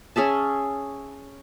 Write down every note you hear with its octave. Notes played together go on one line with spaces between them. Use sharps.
C#4 G#4 E5 A5